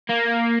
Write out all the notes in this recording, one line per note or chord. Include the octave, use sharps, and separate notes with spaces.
A#3